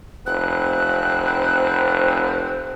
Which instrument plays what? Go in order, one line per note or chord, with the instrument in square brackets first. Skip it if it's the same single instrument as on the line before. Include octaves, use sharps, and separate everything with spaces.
[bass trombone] F1 [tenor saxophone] C4 [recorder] F#6